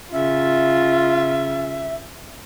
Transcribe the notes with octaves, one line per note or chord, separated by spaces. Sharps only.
C#3 C#4 F4 E5